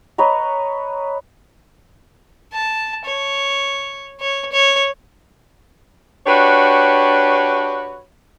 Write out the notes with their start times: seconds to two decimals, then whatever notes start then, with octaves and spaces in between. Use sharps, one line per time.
0.18 B4 C#5 D#5 A#5
2.53 A5
3.06 C#5
4.20 C#5
4.52 C#5
6.27 D4 F#4 G4 B4 C#5